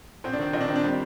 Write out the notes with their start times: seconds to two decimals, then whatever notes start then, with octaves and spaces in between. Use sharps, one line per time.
0.24 A#1 C4
0.33 D4
0.39 D#3 C4
0.53 A#1 D#4
0.61 D4
0.68 D#3 C4
0.76 D4
0.84 G3 C4